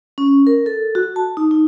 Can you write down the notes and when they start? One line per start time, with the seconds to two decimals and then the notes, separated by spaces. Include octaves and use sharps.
0.18 C#4
0.47 A#4
0.66 A4
0.95 F#4
1.16 A5
1.37 D#4
1.51 D#4